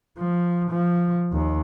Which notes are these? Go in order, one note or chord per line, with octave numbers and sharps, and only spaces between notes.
F3
F3
D#2